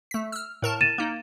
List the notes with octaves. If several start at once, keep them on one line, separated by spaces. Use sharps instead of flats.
A3 B6
E6 F6
A2 A#4 A5
A6 D#7 E7
A#3 D#4